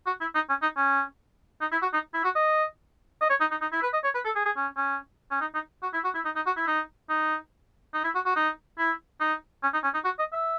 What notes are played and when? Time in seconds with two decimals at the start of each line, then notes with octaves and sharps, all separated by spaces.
0.07 F#4
0.21 E4
0.35 D#4
0.49 C#4
0.62 D#4
0.77 C#4
1.61 D#4
1.72 E4
1.82 F#4
1.93 D#4
2.14 E4
2.24 F#4
2.35 D#5
3.21 D#5
3.30 C#5
3.40 D#4
3.51 D#4
3.61 D#4
3.72 E4
3.83 B4
3.93 D#5
4.04 C#5
4.15 B4
4.25 A4
4.36 G#4
4.46 G#4
4.56 C#4
4.77 C#4
5.31 C#4
5.41 D#4
5.55 D#4
5.83 F#4
5.94 E4
6.04 F#4
6.15 E4
6.25 D#4
6.36 D#4
6.46 F#4
6.57 E4
6.67 D#4
7.10 D#4
7.94 D#4
8.04 E4
8.15 F#4
8.26 F#4
8.36 D#4
8.78 E4
9.20 D#4
9.63 C#4
9.73 D#4
9.84 C#4
9.94 D#4
10.05 F#4
10.19 D#5
10.33 E5